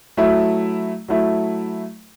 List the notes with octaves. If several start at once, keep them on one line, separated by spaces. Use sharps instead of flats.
F#3 A3 E4
F#3 A3 E4